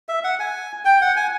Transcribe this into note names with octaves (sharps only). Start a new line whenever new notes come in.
E5
F#5
G#5
G5
F#5
G#5